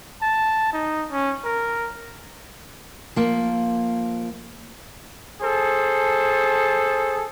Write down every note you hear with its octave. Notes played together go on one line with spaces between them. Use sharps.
A5
D#4
C#4
A#4
F3 A#3
G#4 A4 C5